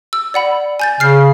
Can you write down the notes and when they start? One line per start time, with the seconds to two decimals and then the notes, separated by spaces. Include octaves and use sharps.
0.13 E6
0.34 D5 F#5 B5
0.80 G#5 G6 A6
1.00 C#3 F6 C7